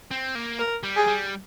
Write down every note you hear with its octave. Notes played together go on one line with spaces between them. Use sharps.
C4
A#3
A#4
G3
G#4
G3